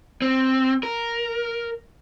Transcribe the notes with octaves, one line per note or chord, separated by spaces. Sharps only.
C4
A#4